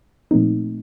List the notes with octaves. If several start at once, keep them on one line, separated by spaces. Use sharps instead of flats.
A#2 F3 A3 C4 D#4